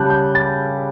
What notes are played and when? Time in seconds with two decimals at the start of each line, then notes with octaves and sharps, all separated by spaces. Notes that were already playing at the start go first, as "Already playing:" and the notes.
Already playing: C#3 G3 A5 B5 F#6 G6
0.10 G6
0.35 A6